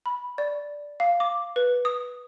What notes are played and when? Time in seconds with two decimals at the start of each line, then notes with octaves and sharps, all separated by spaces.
0.06 B5
0.38 D5
1.00 F5
1.20 D6
1.56 B4
1.85 D#6